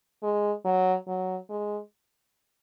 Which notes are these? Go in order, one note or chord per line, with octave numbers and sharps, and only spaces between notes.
G#3
F#3
F#3
G#3